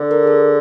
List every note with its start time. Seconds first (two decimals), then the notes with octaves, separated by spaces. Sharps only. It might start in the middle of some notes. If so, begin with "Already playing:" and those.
Already playing: D3
0.11 A#4
0.23 G#4
0.27 A4